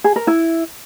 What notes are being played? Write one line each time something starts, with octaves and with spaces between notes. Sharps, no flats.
G#4
A#4
E4